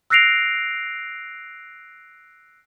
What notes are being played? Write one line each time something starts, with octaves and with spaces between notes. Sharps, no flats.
E6 F#6 A#6 C7 D7 F7